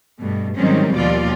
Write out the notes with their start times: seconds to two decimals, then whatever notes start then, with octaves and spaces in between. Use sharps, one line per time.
0.20 G2 B2 A3
0.56 G#2 D#3 F#3 G3 C4 C#4
0.95 D#2 B2 F3 F4 D5